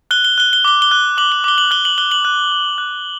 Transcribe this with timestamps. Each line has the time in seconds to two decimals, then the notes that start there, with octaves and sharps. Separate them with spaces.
0.11 F#6 G7
0.25 G7
0.38 F#6 G7
0.53 G7
0.65 D6 G7
0.82 G7
0.91 F#6
1.18 D6 F#7
1.32 G7
1.44 D6 G7
1.58 F#7
1.71 F#6 G7
1.85 F#7
1.98 F#6 G7
2.11 F#7
2.25 F#6
2.52 F#6
2.78 F#6